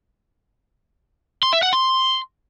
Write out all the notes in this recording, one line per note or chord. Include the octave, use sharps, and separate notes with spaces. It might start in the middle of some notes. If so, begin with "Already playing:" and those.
C6
E5
F#5
C6